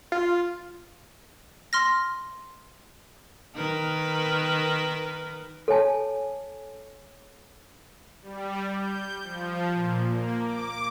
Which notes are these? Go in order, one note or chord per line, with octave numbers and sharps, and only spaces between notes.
F4
C6 F6 A#6
D#3 A#4 B4
A4 C#5 G#5 A5
G3
G6
F3
A#2
A#3
D6